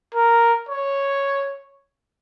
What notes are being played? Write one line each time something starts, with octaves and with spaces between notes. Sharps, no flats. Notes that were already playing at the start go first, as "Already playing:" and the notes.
A#4
C#5